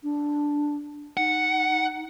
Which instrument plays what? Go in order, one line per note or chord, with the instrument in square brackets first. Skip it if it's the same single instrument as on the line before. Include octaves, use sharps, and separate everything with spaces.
[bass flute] D4
[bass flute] D#4 [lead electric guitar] F#5